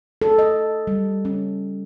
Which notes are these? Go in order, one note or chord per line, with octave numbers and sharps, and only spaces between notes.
A4
D#5
G3
C#4